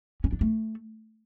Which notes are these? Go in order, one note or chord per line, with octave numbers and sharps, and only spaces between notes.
C#4
D4
A3